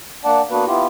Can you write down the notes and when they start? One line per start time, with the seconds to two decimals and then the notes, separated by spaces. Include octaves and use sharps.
0.25 A#3 D4 D5 F#5 A5
0.51 A#3 B3 D4 F#4 B4
0.67 B3 E4 F4 G4